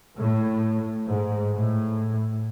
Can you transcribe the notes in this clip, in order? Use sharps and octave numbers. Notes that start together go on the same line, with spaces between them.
A2
G#2
A2